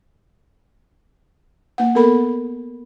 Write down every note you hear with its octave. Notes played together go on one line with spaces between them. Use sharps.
A#3 F#5
B3 A4 A#4 B5